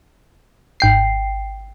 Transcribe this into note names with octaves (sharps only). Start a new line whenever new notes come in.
G#1 G5 C7